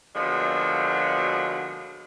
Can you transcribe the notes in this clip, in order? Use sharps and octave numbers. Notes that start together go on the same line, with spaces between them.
B2 D3 F3 F#3 G#3 A#3